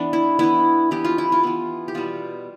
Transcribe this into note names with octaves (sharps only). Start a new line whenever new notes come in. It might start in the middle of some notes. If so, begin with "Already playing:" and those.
Already playing: E3 B3 D4
E4
E3 B3 E4
E3 B3 G4
F4
E4
F4
E3 B3
G4
B2 G3 B3 F4